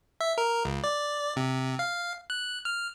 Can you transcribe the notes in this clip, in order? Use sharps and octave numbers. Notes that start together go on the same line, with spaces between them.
E5
A#4
C#2
D5
C3
F5
F#6
F6